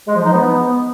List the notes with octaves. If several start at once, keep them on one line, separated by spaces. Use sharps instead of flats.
G#3
F3
D#4
B3